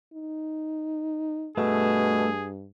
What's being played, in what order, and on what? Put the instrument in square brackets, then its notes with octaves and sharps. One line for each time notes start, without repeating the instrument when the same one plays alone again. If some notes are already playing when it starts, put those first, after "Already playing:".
[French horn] D#4
[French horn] G2 [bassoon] B2 [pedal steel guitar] A3 [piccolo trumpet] G#4